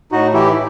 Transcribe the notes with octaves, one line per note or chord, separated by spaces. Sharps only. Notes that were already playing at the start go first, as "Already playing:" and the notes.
A2 D#4 F#4
E3 E4 G4